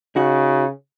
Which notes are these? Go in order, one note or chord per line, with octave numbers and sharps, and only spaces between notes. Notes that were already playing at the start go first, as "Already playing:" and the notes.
C#3 D#4 F#4